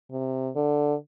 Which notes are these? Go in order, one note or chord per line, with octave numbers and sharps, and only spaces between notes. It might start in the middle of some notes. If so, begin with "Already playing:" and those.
C3
D3